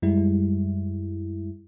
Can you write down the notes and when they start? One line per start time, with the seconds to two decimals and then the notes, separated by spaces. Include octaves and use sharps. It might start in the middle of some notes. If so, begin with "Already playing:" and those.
0.02 F#2 G3 G#3 E4